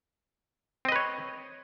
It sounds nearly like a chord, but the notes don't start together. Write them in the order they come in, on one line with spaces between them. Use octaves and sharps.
C4 D#5 B4 C#5